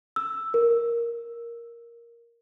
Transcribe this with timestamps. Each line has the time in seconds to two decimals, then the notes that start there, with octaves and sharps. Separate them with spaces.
0.16 E6
0.54 A#4